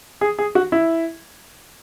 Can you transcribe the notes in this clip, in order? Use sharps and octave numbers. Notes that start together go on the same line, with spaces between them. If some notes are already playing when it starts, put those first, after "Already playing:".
G#4
G#4
F#4
E4